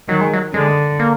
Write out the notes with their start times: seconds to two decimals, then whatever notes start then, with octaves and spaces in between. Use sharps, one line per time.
0.08 D#3 F#3
0.21 G#3
0.33 F#3
0.53 D3 G#3
0.99 A#3